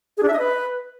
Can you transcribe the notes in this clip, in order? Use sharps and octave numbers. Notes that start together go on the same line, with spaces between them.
G#4
D4
E5
D#5
B4